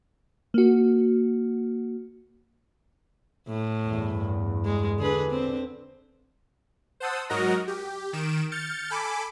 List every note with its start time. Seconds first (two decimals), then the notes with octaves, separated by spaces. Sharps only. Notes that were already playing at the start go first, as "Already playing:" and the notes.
0.54 A#3 F#4
3.48 A2
3.85 E2 G2
4.65 G#3
4.99 D3 G#4 B4
5.31 C4
7.00 C5 F#5 A5 D#6 E6
7.29 G#2 F#3 F#4 A#4 D#5 A#5
7.68 G4
8.13 D#3 D7 E7
8.51 F6 G6 A6 C#7
8.90 A4 G#5 B5 D6